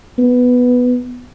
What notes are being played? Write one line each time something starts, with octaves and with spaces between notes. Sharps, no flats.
B3